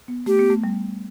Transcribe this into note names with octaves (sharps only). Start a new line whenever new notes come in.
B3
A3 G4
B3
A3
G3